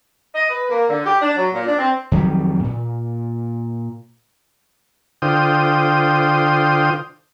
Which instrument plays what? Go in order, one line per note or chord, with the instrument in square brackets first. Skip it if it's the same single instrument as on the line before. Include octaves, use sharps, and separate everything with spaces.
[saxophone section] D#5
B4
A#3
D3
G4
D4
F#3
A#2
D4
C4
[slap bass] F2 D#3 F#3 G3
A#2
[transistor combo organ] D3 F4 C5 G5 D#6